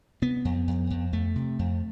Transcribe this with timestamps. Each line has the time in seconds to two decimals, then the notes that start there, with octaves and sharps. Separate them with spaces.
0.22 C3 B3
0.45 F2
0.68 F2
0.91 F2
1.12 F2 A3
1.36 C3
1.59 F2